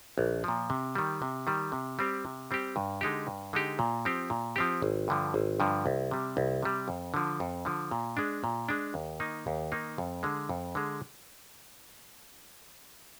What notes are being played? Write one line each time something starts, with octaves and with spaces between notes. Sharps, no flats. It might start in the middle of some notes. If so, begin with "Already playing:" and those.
A#1
A#2 F3
C3
D#3 G3
C3
D#3 G3
C3
G3 C4 G4
C3
G3 C4 G4
G2
D3 G#3 D#4 G4
G2
D3 G#3 D#4 G4
A#2
F3 C4 G4
A#2
F3 C4 G4
G#1
G2 D3 F3
G#1
G2 D3 F3
C2
C3 G3
C2
C3 G3
F2
D3 F3
F2
D3 F3
A#2
G#3 D4
A#2
G#3 D4
D#2
D#3 A#3 D#4
D#2
D#3 A#3 D#4
F2
D3 G#3
F2
D3 G#3